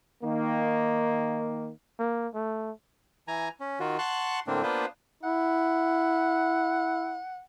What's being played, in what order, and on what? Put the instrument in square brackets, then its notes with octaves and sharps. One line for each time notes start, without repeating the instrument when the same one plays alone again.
[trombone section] D#3 A#3
[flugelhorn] A#3
A3
[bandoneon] E3 G#5 A#5
C#4
D#3 F4 F#4
F#5 A5 C6 C#6 F#6
A2 D3 A#3 C4 D4
A#3 B3 D4 F4 B4 C5
[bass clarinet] E4 [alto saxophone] F#5